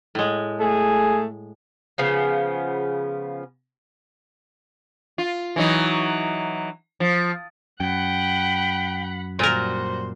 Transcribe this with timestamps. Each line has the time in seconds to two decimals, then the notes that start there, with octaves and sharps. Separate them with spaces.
0.15 A2 G#3
0.60 A3 G#4
1.98 C#3 F3 B3
5.18 F4
5.56 E3 F#3 D#4
7.00 F3
7.80 F#2 F#5 G5 B5
9.39 A#2 G3 F#4 A#4 C5